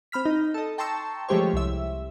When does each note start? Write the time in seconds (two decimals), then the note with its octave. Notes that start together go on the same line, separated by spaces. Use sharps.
0.12 C4 B5 F6 B6
0.25 D#4
0.54 A4 D#5
0.78 G5 A5 A#5 C6 C#6 E6
1.29 F3 G#3 A3 G4 C5 C#5
1.53 C2 E5